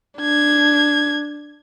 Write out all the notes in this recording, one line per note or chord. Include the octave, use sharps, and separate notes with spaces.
D4 G#6